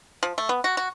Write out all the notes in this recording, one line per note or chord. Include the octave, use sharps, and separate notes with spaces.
F3
A3
B3
F#4
F#4